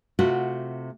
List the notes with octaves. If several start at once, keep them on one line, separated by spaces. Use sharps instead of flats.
C3 A3 F4 F#4